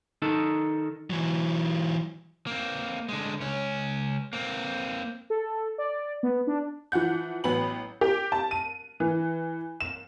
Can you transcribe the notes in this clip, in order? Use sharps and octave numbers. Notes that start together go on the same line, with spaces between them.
D#3 D#4 A4 A5
E3 F#3
A#3 C4
D3 G#3
C#2 C#4
A#3 C4
A4
D5
B3
D4
E3 F3 F#5 G6
A1 F#3 B3 B5 F#7
G4
A5
D#7
E3
E7